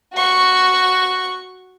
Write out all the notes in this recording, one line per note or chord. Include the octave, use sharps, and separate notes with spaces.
F#4 C#6